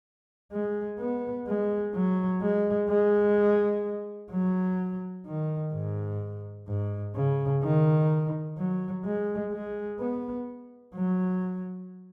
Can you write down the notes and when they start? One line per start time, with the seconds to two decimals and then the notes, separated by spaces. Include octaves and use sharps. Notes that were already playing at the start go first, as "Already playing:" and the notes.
0.52 G#3
0.99 B3
1.47 G#3
1.95 F#3
2.41 G#3
2.90 G#3
4.31 F#3
5.27 D#3
5.73 G#2
6.68 G#2
7.16 C#3
7.63 D#3
8.58 F#3
9.05 G#3
9.53 G#3
10.00 B3
10.95 F#3